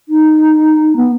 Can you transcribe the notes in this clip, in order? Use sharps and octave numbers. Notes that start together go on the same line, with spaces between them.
D#4
B3